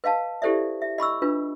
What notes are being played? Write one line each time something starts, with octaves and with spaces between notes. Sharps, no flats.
B4 D#5 F5 A5
E4 G4 A4 C5 D5 E5
E5
D#5 B5 C#6 E6
D4 F4 B4